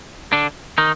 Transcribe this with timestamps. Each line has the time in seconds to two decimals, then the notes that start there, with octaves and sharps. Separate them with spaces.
0.33 D3 D4
0.78 D#3 D#4